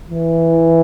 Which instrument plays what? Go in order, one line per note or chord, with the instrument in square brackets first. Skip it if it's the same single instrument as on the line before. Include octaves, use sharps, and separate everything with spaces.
[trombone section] E3